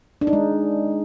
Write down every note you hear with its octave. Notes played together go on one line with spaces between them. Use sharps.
D4
D#4
G#3